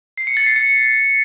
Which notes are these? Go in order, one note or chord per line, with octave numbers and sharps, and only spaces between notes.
C7
C#7
A6
C7
C#7